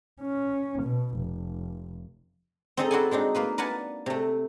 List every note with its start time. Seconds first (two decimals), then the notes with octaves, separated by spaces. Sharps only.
0.21 C#4
0.82 B2
1.17 F1
2.77 C4 D#4 G#4 A4 D#5 A#5
2.91 E4 F#4 C5 D5 F#5 G#5
3.11 G#3 C4 D4 D#4
3.35 A#3 F4 B4
3.58 A#4 B4 D5 F#5 G#5 A5
4.06 C3 A3